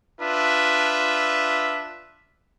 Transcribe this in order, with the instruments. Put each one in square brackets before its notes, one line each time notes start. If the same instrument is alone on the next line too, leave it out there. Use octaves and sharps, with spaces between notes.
[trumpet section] D4 F4 B4 E5